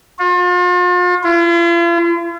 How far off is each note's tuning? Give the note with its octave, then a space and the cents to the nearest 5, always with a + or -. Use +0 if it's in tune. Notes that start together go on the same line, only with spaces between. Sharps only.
F4 +40
F4 -45